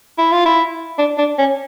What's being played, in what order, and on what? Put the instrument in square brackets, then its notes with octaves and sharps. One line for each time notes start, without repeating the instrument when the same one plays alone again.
[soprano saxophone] E4
F4
E4
D4
D4
C#4